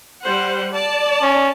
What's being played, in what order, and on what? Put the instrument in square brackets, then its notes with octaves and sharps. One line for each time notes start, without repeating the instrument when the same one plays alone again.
[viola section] G3 C5 F#5
D5 A5
[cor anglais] C#4